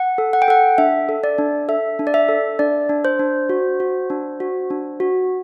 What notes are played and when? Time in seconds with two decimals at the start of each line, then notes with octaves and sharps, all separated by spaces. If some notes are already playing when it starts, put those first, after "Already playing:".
Already playing: F#5
0.18 A4
0.33 F#5
0.42 G5
0.48 A4 F#5
0.78 D4 E5
1.09 A4
1.24 D5
1.38 D4
1.69 A4 E5
1.99 D4
2.07 D5
2.14 E5
2.29 A4
2.59 D4 D5
2.89 D4
3.05 C5
3.19 D4
3.49 F#4
3.80 F#4
4.10 D4
4.40 F#4
4.70 D4
5.00 F#4